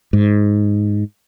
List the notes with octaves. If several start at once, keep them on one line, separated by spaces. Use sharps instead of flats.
G#2